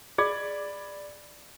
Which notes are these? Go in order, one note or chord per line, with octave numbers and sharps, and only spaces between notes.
G#4 D5 B5 G#6